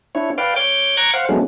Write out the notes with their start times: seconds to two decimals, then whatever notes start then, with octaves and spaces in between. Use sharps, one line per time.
0.15 D4 E4 C#5
0.38 B4 D5 F5 G5
0.56 C#5 D6 G6
0.97 A#5 C#6 D6 F#6 G#6 A#6
1.13 C5 F5 F#5
1.29 F#3 G#3 A3 B3 C#4 D4